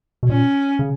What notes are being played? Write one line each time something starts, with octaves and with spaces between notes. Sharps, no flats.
B2
A#2 C#4
C#3